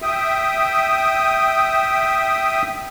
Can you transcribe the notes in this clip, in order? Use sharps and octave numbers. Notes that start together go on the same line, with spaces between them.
E5 G5 D#6